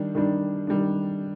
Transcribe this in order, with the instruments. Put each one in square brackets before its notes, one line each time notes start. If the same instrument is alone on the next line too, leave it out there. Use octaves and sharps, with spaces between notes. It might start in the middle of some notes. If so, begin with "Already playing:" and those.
Already playing: [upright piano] D#3 G3 D4
D#3 G3 D4
D#3 G3 D4